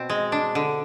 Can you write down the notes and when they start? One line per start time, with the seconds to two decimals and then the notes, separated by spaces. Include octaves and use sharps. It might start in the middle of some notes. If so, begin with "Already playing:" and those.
Already playing: B2 C4
0.10 G#3
0.32 D4
0.55 D3